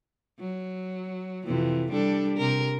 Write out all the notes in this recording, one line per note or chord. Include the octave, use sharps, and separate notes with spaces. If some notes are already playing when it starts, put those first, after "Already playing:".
F#3
F2 C3 E3
G3 D4 A4
C3 A#4